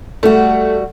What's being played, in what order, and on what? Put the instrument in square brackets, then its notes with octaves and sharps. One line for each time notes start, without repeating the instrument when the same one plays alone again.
[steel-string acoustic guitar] G3 F#4 [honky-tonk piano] A3